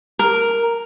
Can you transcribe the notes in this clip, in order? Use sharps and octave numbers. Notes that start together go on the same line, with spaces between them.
A#4